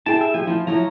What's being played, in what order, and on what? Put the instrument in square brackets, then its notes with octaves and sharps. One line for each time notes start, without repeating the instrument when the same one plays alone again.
[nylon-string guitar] E4 G4 G#4 [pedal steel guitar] G5 A5
[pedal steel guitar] E5
[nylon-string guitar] F3 G4 [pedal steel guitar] G#5
[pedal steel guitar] F3 [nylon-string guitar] E4 F4
[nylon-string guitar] F3 F#3 E4 [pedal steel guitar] A#5